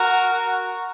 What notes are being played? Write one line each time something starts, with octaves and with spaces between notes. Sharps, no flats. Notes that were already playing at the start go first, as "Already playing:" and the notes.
Already playing: F#4 A#4